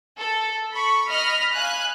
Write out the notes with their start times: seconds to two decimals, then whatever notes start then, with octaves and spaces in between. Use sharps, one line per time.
0.18 A4
0.73 B5 C#6
1.10 D#5 B5 F6
1.53 F5 G#5 F#6